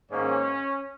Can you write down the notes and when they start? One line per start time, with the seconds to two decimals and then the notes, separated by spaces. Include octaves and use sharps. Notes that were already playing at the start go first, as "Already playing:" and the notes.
0.11 G#2 D#3 A#3 C#4 C#5